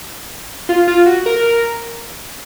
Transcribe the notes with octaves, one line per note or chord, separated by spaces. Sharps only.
F4
F4
F#4
A#4